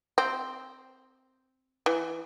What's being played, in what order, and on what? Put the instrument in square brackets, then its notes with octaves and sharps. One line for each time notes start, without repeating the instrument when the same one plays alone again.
[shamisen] C4
E3